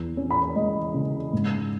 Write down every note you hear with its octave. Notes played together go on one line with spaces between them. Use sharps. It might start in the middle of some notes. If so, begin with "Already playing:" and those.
Already playing: E2
C#4
B5
G#3 D#5
C#3
G#2